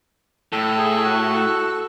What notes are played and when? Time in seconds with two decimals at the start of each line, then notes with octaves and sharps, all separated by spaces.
0.53 A2 A4
0.78 G#4
1.05 F#4